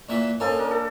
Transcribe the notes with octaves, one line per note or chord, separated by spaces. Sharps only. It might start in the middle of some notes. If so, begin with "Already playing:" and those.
A#2 E3 E5
A#3 C#4 D#4 A4 C5
D4 A#4
A4